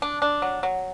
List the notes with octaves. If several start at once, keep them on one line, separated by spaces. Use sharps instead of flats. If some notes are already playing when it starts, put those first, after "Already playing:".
D4
D4
F#3
F#3